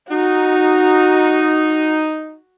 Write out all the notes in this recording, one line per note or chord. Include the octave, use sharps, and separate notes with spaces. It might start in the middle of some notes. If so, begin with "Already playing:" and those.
D#4 F#4